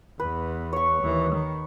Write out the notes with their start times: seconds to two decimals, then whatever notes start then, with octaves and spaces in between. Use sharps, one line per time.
0.20 E2 B4
0.73 C#5 C#6
1.02 D#2 E3
1.33 D#3